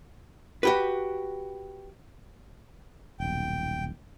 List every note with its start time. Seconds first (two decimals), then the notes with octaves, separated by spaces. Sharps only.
0.63 F#4 G4 B4
3.20 D#1 B1 G5